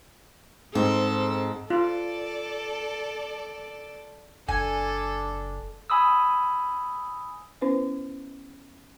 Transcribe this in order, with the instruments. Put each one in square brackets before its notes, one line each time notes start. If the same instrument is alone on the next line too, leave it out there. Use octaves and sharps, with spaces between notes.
[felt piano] G#2 [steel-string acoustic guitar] C4 [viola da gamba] A4
[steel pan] F4 [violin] A4 D5
[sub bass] F#1 [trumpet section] D4 [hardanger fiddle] A4 [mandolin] G#5
[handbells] G#5 B5 D#6 E6
[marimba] B3 C#4 E4 B4 C5